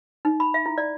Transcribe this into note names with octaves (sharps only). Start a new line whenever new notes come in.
D#4
B5
E5
E4
D5